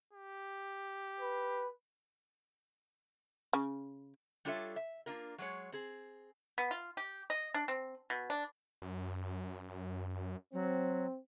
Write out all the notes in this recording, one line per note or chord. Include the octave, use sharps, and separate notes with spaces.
G4
B4
C#3
G3 D4 F4 A4 C#5 E5
E5
A#3 D4 F4 A#4
F#3 G#3 C#5
C4 G#4
B3
F4
G4
D#5
D4
C4
B2
D4
F#2
F#3 C4